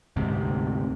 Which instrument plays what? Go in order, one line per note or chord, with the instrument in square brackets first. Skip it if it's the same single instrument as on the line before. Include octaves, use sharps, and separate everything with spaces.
[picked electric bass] D2 G#2 C3